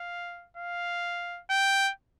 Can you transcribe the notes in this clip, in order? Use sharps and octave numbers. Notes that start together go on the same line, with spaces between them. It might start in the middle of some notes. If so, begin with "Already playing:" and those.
Already playing: F5
F5
G5